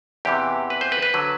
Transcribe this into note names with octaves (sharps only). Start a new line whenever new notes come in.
E2 C3 E3 G4
B4
C5
B4
B4
D3 F#3